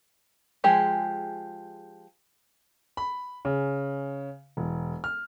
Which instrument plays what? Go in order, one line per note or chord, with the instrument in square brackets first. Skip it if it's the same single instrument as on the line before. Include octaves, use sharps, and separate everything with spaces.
[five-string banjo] F3 G#3 G4 G#4
[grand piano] B5
C#3
E1
F6